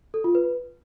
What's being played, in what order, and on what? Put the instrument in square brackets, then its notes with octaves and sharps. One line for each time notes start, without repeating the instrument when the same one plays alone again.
[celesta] A4
F4
B4